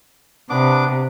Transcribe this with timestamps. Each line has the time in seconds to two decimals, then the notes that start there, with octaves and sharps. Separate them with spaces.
0.50 C3 B3 D4 D6